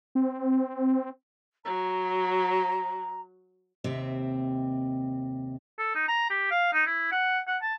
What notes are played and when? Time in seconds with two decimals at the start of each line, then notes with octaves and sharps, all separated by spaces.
0.15 C4
1.65 F#3 A#5
3.84 D#2 C3 C4 E5
5.79 A4
5.95 D#4
6.08 A#5
6.30 G4
6.51 F5
6.73 D#4
6.86 E4
7.12 F#5
7.47 F#5
7.62 A5